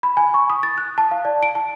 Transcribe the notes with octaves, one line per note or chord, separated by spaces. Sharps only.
B5
G#5
C#6
D#6
A6
F#6
A5
F5
D5
D7
A5